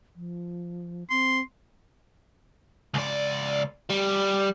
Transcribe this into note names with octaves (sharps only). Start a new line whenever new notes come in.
F3
C4 C6
C#2 D5
G3